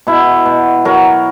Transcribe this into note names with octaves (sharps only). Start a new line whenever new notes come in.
B2 E4
B2
F#3 A#4